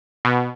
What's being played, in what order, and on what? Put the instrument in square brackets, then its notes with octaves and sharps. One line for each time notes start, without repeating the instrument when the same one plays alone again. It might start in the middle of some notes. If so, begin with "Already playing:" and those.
[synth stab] B2